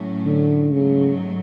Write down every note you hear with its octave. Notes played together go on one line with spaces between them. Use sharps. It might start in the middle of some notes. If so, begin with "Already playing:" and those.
Already playing: A2 F#3 A3 C#4
D3
G#2 C#3 F#3 A3